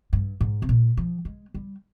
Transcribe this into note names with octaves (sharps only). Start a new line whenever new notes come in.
G2
G#2
C3
A#2
F3
G#3
G3